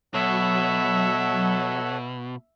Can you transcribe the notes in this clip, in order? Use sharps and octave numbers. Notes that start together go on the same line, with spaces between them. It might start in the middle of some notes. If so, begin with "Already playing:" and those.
B2 F#3 A4 C#5 E5 F#5